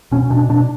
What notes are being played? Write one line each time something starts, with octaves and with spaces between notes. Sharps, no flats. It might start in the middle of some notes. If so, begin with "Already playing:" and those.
B2 C#4
B2 D4
B2 D4